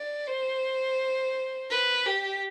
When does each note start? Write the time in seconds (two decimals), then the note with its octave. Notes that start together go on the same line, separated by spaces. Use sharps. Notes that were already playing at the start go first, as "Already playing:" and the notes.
Already playing: D5
0.28 C5
1.70 B4
2.06 G4